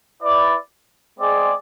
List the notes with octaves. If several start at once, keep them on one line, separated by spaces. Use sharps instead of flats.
E4 B4 D5
G#3 C4 G#4 D5